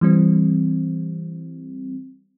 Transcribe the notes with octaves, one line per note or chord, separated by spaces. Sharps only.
E3 G3 C4